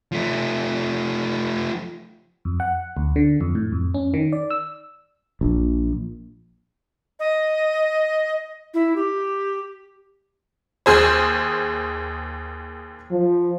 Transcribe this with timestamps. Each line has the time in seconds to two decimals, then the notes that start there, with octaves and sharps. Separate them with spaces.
0.12 F3 A3
2.45 F2
2.60 F#5
2.97 D2
3.16 D3
3.41 F2
3.55 A2
3.72 F2
3.94 C#4
4.14 D#3
4.32 D5
4.50 E6
5.41 A#1
7.20 D#5
8.74 E4
8.96 G4
10.86 D#2 G#4 C5
13.11 F3